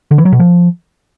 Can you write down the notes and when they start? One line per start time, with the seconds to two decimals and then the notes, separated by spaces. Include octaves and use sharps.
0.11 D3
0.18 E3
0.25 F#3
0.32 B2
0.40 F3